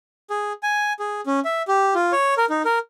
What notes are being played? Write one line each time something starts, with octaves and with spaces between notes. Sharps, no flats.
G#4
G#5
G#4
C#4
E5
G4
F4
C#5
A#4
D#4
A#4